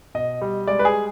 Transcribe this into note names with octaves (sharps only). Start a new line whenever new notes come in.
B2 D#5
G3
G#3 D5
B4
G#4